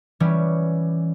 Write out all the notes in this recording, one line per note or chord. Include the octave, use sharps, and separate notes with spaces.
E3 G3 C#4